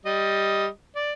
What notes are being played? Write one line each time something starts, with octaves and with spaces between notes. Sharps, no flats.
G3 D#5
D5